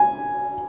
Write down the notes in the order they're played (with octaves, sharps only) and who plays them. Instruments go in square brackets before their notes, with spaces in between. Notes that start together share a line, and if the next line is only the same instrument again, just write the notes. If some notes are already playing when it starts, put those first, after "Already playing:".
Already playing: [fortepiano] G#5